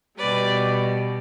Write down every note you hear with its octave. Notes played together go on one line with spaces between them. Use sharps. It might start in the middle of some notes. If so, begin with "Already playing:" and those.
B2 G3 B4 D5